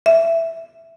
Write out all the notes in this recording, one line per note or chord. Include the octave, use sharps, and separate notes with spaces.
E5